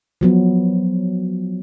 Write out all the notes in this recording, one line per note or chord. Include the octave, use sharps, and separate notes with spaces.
F3 F#3 B3